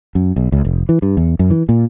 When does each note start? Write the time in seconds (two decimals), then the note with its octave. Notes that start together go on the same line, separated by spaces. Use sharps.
0.15 F#2
0.36 B1
0.52 C#2
0.65 F1
0.89 E3
1.02 G2
1.17 E2
1.39 F#2
1.50 E3
1.69 A#2